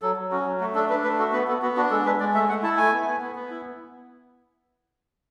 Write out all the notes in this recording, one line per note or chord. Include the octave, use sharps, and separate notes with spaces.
F#3 A4
F#3
C#4 F#4
F#3
A3 F#4
D4 A4
D4 B4
A3 B4
F#4 A4
B3 B4
B3 A4
B3 F#4
D4 F#4
G#3 A4
G#3 B4
G#3 D5
A3 E5
A3 F#5
E4 A5
A3 G#5
B3
B3
B3
B3
E4